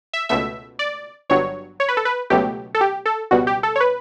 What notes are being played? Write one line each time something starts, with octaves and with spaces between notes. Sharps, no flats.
E5
C#2 B2 A3 E5
D5
G1 G2 F#3 C#5
C#5
B4
A4
B4
C#2 B2 F#3 A3 G4
A4
G4
A4
C#2 B2 G3 F#4
G4
A4
C#5
B4